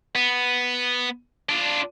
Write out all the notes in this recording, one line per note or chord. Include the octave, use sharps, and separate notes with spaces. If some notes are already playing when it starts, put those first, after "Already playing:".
B3
D4 F4